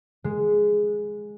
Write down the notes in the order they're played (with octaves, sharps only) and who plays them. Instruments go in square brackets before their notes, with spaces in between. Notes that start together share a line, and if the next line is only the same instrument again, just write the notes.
[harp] G#3